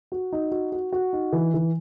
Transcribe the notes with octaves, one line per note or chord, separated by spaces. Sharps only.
F#4
D#4
F#4
F#4
F#4
D#4
E3
E3